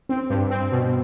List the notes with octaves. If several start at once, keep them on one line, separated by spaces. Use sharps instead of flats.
C4
G2
C4
B2